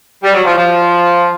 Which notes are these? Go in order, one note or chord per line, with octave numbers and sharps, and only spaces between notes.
G3
F#3
F3
F3